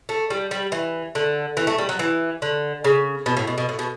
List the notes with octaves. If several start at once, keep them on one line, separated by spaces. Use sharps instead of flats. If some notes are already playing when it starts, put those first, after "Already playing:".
A3
G3
G3
E3
D3
E3
A3
G3
F#3
E3
D3
C#3
B2
A2
B2
B2
A2
B2